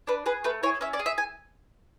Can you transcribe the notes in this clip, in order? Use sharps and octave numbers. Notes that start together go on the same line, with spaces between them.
D4 B4
G#4 B4
A3 B4
E4 G#4 C#5
C#4 E5
D5
G#4
E5
G#5